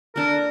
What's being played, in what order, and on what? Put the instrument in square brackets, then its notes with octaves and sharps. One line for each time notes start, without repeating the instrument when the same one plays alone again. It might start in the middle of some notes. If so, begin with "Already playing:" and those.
[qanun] A#3 D4 A4 [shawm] A#4